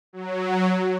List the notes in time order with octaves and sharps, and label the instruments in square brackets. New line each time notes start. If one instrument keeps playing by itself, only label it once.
[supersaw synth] F#3